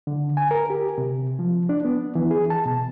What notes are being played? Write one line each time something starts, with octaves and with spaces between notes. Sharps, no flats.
D3
G#5
A#4
G4
C3
F3
D4
B3
E3
G#4
A5
B2